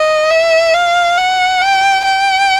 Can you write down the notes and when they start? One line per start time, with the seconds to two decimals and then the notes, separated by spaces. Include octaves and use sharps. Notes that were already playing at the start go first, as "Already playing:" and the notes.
Already playing: D#5
0.30 E5
0.74 F5
1.17 F#5
1.61 G5
2.04 G5